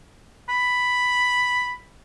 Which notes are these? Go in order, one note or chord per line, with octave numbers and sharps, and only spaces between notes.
B5